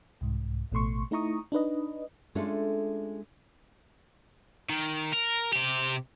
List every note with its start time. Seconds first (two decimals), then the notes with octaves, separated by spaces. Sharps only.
0.21 C2 G#2
0.72 A1 B2 A3 C6 C#6
1.11 A3 D#4 E4 A#5 C#6 D#6
1.52 D4 D#4 B4 D#5
2.35 G#3 A3 C#4 D4 F4 A4
4.70 D#3
5.14 A#4
5.53 C3 G4